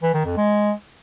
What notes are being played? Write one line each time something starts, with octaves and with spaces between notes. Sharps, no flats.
E3
D#3
F2
G#3